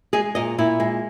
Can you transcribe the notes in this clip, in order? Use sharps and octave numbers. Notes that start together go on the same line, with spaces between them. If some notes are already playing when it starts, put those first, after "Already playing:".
G#3 G#4
A#2 D#5
A#2 E4
G#3